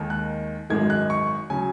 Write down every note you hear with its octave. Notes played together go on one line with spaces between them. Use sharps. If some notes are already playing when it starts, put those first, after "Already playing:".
Already playing: D#2 D#3 G#3
F#6
G#1 F#2 D#3 G#3 G#6
F#6
C#6
C#3 F#3 G#5